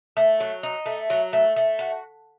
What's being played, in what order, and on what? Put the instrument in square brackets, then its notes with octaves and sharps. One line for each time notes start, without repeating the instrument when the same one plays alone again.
[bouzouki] A3
F#3
D#4
A3
F#3
A3
A3
F#4